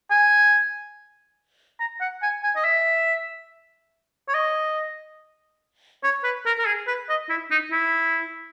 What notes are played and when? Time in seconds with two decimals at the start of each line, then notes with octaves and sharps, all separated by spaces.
0.10 G#5
1.80 A#5
2.01 F#5
2.23 G#5
2.43 G#5
2.56 D#5
2.64 E5
4.28 C#5
4.34 D#5
6.04 C#5
6.24 B4
6.46 A#4
6.59 A#4
6.66 G#4
6.87 B4
7.09 D#5
7.29 E4
7.51 D#4
7.72 E4